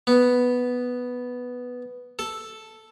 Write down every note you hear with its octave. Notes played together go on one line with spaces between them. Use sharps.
B3
A4